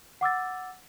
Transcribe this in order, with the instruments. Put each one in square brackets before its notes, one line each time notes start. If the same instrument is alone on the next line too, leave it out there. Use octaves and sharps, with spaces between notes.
[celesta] F#5 D6 E6 A6